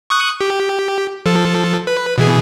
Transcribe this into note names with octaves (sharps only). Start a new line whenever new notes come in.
C#6 D#6 F#6
G4
F3 A4
B4
B2 E3 G#4